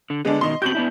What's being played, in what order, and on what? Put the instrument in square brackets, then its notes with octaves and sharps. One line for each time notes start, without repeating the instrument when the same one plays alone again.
[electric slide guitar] D3
[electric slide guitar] D3 B3 [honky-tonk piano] G#3 D4
[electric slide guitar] B2 D#3 [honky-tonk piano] D#5 C6
[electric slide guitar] C4 F#4 G4 [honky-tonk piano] G6 F#7
[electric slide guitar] B3 D4 E4